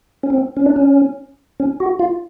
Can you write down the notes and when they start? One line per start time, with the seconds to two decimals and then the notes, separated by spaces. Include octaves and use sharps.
0.23 C#4
0.30 C4
0.57 C#4
0.66 D4
0.76 C#4
1.60 C#4
1.80 F#4
1.99 F4